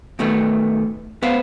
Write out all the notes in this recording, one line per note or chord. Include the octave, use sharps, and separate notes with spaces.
B2 D#3 A3 B3
B3 B4 C5 F5